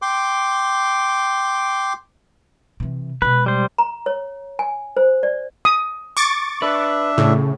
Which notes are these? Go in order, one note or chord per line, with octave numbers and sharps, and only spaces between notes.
G5 C6 D6
C3 E3
B2 G#3 B4
G3 C5
A#5
C#5
G#5
C5
D5
D#6
C#6 D6 A6
D4 B4 E5
A2 C#3